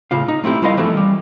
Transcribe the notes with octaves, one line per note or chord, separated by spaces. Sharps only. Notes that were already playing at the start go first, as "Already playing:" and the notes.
A2 C#3 F4 F5
D#4
A3 C4 E4 G4
G3 E4 F4 A#4 D#5 F5
E3 F3 A3 C#4 E4 A4
G3